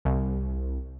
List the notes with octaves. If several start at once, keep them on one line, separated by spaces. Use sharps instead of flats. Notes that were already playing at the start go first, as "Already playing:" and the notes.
C2